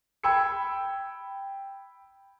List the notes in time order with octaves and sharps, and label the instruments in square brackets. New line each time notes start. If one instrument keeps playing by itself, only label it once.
[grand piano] G5 B5 E6 G#6 C#7